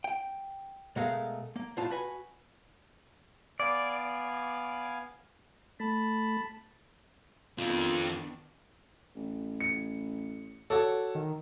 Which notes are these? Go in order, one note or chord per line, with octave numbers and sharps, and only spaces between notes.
G5
B2 G#3 A3 A#4 F5
A#3
C2 A2 F4 A5
F#4 B4 G#5
B3 D5 F5 G#5
A3 A5 B5
F2 D#3 F3 B3 D4
A1
C#7
F#4 A4 C#5 D5
D#3